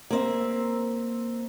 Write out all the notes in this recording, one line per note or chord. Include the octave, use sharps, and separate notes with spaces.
A#3 C4 E5